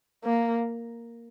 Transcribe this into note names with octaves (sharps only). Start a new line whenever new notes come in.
A#3